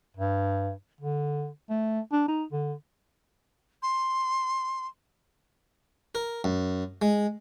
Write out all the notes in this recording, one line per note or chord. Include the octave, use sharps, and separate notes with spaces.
G2
D3
A3
D4
D#4
D3
C6
A#4
F#2
G#3